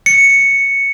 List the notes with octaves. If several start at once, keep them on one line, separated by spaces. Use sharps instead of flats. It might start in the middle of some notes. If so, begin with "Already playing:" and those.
C#7